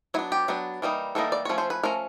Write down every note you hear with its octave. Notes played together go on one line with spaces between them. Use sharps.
F#3 B3 D4 E4
G4
F#3 B3 D4
E3 G3 A#3 D#4
E3 G3 A#3 D#4 A4
D5
F3 A3 C#4 C#5
C5
B4
F3 A3 C#4 A#4